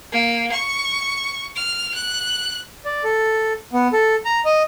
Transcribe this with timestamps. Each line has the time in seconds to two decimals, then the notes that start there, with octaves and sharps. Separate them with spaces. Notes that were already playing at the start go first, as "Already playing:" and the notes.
0.12 A#3
0.52 C#6
1.56 F6
1.95 F#6
2.85 D5
3.04 A4
3.73 B3
3.93 A4
4.25 A#5
4.45 D#5